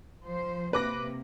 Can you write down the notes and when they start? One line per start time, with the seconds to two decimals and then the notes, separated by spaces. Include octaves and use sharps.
0.24 F3 C5
0.73 C3 A#3 B4 D6 A#6